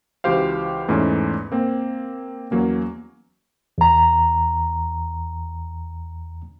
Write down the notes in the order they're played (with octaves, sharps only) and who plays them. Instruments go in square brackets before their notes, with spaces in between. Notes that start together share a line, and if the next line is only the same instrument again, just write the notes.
[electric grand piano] C#2 E3 F#4 G4 C5 F5
E2 G#2 E3 A3 C#4
A#3 C4
E2 F#3 A#3 C#4
[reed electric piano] E2 A#5